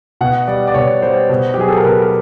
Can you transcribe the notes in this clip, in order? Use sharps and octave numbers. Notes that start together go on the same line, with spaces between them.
B2 F#5
G3 D5
D5
B2 C#5
G3 C5
B2
G4
F#3 G#4
A4
A#4
B2 B4
A#4